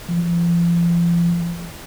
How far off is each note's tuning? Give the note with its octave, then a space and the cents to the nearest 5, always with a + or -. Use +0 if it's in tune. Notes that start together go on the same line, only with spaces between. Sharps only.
F3 -35